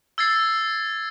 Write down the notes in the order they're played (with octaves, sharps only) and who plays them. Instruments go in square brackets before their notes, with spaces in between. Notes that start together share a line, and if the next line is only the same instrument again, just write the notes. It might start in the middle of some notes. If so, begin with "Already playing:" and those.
[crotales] E6 G#6 A6 C7